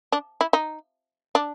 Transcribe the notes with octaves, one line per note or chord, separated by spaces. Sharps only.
D4
E4
D#4
D4